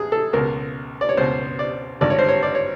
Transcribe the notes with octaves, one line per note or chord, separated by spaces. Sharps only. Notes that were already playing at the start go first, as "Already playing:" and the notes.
Already playing: A#1 G#4
A4
C#2 B2 A#4
D5
C#5
C#2 B2 C5
D5
G#1 G2 D3 D5
C#5
C5
C#5
D5
C#5